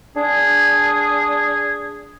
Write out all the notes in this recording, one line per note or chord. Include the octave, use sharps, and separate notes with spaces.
D4 G#4